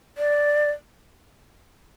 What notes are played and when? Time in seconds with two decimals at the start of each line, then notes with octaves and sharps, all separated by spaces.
0.18 D5